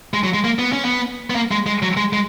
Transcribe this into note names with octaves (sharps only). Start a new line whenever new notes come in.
G#3
F#3
G#3
A#3
B3
C#4
B3
B3
A#3
G#3
G#3
F#3
G#3
G#3